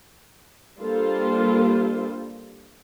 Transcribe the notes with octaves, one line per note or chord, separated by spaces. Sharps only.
G3 A#3 D4 F4 A4 C5